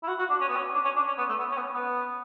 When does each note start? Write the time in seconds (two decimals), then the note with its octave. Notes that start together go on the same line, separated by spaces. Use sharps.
0.03 E4
0.08 F#4
0.19 F#4
0.29 D4
0.41 C#4
0.48 B3
0.56 C#4
0.74 D4
0.84 C#4
0.96 D4
1.07 C#4
1.18 B3
1.29 A3
1.39 B3
1.51 C#4
1.57 B3
1.62 C#4
1.73 B3